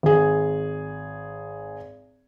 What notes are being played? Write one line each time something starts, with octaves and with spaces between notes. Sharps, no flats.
G#1 G#4